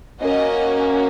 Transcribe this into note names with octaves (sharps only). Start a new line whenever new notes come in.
A#3 C#4 F#4 D#5